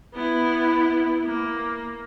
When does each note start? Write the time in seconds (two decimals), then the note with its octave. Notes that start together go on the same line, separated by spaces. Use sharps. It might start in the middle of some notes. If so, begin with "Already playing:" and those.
0.14 B3 E4
1.24 A#3